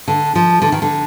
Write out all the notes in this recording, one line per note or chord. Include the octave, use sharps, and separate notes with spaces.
D3
F3
D3
D#3
D3